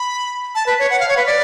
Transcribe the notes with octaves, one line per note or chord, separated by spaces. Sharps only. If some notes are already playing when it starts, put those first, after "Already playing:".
Already playing: B5
A5
B4
C#5
F#5
F5
C#5
B4
D5